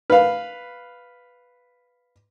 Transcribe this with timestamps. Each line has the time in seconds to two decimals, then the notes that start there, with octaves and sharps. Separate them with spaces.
0.10 B4 F5